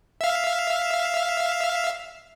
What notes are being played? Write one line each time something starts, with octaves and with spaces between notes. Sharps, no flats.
E5 F5